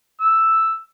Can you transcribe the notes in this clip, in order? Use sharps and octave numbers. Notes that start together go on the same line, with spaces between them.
E6